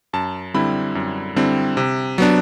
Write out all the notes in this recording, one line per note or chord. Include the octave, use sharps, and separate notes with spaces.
F#2 A5
D3 G3 C4 E4 B5
F#2
D3 G3 C4 E4
C3
F#3 B3 D4